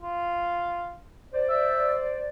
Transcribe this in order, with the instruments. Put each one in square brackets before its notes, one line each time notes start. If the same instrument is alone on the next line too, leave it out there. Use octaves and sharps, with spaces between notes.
[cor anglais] F4
[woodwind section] C5 D5
[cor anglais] E5